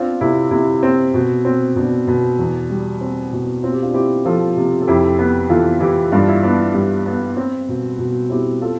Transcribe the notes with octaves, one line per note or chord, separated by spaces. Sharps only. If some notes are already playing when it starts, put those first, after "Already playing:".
Already playing: B3 C4 D4 F4
C3 E4
C3 E4
C4
B2
C4
B2 D4
B2
E2
G3
C4
B2
C4 F4
G4
D4 F4
C4 E4 G4
F3 F4 A4
C3
A4
F2 E4 G4
B3
E3 F4 A4
E3 E4 G4
G2 D4 F4
E4
B3 D4
E4
G2
B3
C4
B2
B2
C4 E4 G4
F4 A4